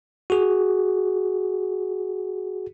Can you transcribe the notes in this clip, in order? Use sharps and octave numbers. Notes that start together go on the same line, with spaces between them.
F#4 G#4